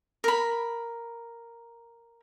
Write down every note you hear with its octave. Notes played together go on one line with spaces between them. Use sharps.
A#4 B5